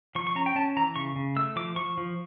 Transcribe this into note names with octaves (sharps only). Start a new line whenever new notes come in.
F3 C#6
C#6
C#4 A#5
G5
C#4 A5
E3 A#5
C#3 C#6
C#3
A3 E6
F3 D6
F3 C#6
F3